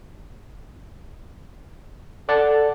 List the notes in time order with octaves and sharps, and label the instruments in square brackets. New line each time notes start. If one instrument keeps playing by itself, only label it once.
[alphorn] A4 [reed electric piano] D5 F#5 A5